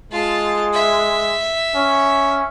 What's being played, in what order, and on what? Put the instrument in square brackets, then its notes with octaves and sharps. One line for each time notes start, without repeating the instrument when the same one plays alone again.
[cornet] G#3 [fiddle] F4 A5
[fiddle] E5
[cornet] C#4